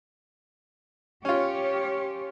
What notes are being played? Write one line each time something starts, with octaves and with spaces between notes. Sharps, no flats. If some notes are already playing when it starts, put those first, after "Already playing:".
C#4 F4 G4 C#5